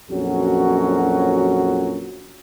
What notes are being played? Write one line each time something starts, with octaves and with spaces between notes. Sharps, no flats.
A#1 F2 F#3 C#4 F#4